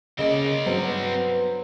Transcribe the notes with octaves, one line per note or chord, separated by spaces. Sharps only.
C#3 A#3 C4 D5 D#5
G2 F#3 B3 C5